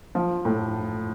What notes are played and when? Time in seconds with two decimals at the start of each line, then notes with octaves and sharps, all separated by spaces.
0.15 F3
0.45 A2